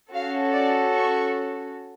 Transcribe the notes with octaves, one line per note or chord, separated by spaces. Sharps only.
C#4 F#4 A4 F5
D5
C#6